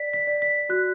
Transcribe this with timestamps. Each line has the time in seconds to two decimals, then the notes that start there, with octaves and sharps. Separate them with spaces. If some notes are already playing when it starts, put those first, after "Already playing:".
Already playing: D5 B6
0.13 B6
0.27 D5
0.42 B6
0.69 F#4 F#6